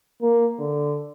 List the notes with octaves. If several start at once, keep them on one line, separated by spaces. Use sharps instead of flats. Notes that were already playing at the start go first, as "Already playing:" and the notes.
A#3
D3